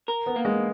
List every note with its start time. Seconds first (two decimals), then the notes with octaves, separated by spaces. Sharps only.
0.08 A#4
0.26 B3
0.36 A#3
0.45 G#3